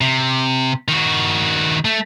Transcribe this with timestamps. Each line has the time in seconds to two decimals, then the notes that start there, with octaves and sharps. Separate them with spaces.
0.01 C3
0.88 D#3 F#4
1.85 A3